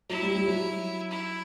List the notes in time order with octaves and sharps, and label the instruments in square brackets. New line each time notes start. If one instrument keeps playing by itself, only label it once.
[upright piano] F#3 [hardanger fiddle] E4
[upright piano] G3
G3
F#3
[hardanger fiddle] E4